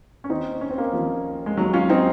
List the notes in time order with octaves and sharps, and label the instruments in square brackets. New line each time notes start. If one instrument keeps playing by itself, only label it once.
[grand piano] C#4
D#2 D#3 C4 D#4
C#4
C4
A#3 C#4
D#2 D#3 F3
G#3
D#2 D#3 F#3
C#4 F4
C4 D#4